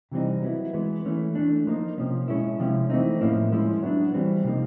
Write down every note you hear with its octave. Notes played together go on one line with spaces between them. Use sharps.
C3 E3 G3 C4 D#4
F#3 B3 E4
E3 G#3 B3
E3 A3 C#4
E3 A3 D4
F3 A#3 D#4
C3 F3 A#3 C#4
B2 G#3 C#4 E4
C3 F3 G#3 C#4 E4
E3 A3 C4 D#4
A2 F3 A#3 C#4 E4
F3 G#3 C#4 E4
F#3 B3 D4
E3 G3 C4
C3 F3 A#3 D#4